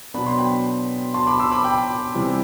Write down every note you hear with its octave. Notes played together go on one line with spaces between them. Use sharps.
B2 F#3 B3 D4 B5
C6
G5 B5
A5 C6
B5 D6
C6 E6
B5 D6
G5 B5
C3 E3 G3